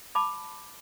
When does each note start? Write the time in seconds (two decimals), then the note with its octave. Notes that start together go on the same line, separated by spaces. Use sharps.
0.15 A5 B5 D6